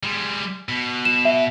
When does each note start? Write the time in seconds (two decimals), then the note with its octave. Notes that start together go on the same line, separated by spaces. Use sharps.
0.03 G3 G#3
0.69 B2
1.05 E7
1.25 E5